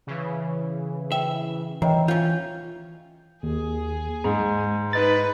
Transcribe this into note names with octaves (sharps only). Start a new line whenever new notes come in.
C#3 E3
E5 G5
D#3 E3 C#5 D#5 G5
C#4 F4 G6
D#2 G#4
G#2 G#3
D#4 B4 D#5 A6